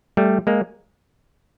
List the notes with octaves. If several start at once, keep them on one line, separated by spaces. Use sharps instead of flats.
G3 A3
G#3 A#3